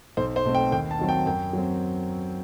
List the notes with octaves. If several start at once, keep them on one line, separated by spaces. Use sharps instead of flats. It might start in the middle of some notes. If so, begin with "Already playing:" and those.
B1 C5
C5
B2 A3 C4
G5
D#2 G5
A5
D#3 F#3 C4
G5
F#2 G5
F#3 C4